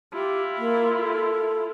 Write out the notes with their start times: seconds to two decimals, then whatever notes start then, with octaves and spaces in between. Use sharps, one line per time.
0.13 E4 F4 G4
0.59 A#3
1.00 A4